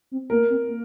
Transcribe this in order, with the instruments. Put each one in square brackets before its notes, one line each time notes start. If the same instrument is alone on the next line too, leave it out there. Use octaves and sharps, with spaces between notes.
[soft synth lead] C4
[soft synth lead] A#3 [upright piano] A#4
[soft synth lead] C4
A#3